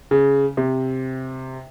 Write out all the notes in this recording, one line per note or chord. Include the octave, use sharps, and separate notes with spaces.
C#3
C3